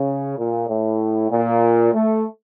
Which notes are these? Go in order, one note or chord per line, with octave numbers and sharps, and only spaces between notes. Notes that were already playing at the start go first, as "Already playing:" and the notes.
Already playing: C#3
A#2
A2
A#2
A3